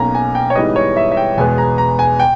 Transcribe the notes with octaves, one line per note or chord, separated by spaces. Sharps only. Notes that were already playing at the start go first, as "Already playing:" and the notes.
Already playing: B1 B2 A#3 C#4 G#5 A#5
G#5
G5
C#5
G#2 E3 G3 B3 D#5
C#5
E5
E5
G5
E2 B2 G#3 B3 G#5
A#5
A#5
G#5
G5